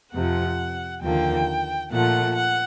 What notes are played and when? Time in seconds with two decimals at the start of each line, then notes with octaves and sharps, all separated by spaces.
0.13 F2 C3 F3 F#5
1.02 D#2 D3 F3 A#3 G5
1.91 A#2 F3 A3 F#5
2.36 F#5